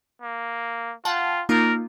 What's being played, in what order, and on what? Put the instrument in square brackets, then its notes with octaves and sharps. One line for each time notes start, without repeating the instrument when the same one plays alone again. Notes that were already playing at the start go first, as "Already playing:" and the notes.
[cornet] A#3
[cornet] F4 [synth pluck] F#5 G5 A5
[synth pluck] A#3 D#4 F4 [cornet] A#4